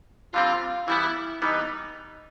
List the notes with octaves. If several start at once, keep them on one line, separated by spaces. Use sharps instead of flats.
D3 G3 C4 F4
E3 G3 B3 E4
E3 G3 B3 D#4